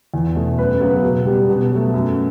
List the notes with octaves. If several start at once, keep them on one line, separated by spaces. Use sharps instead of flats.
E2
B2 A3
F#2 B4
C#3 F#3 B3
B2
G3 B3
B2
F#3 A3
F#2